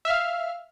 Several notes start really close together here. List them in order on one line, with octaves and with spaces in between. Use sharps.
E5 F6 F5